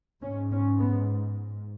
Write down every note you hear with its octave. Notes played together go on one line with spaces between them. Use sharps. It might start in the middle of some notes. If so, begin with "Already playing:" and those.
G#2 C#4
C#4
B3